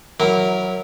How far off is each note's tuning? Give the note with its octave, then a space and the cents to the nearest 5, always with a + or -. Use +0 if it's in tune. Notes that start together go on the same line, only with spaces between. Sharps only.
F#3 +0 E4 -20 A#4 +0